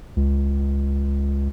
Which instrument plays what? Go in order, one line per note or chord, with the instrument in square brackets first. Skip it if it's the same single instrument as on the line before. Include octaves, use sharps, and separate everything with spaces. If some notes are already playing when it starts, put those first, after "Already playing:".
[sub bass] C#2